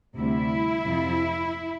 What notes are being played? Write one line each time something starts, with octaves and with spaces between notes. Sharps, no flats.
D2 C3 G3 E4
F2 C3 F3